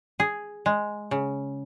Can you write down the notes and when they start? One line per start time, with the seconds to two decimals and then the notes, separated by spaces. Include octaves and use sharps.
0.20 G#4
0.66 G#3
1.11 C#3